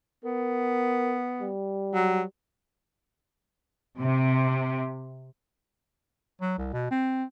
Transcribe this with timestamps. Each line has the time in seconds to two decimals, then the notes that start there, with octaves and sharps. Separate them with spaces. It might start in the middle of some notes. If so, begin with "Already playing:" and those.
0.24 B3 A#4
1.41 G3
1.94 F#3
3.98 C3
6.41 F#3
6.58 C2
6.73 B2
6.91 C4